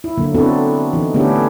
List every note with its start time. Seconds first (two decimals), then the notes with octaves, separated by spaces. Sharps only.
0.04 E4
0.18 D3 F#3 A#3
0.34 B3 C4 D4 E4 F#4 A4
0.93 E3 D#4
1.14 D3 A3 B3 C#4 D4 G4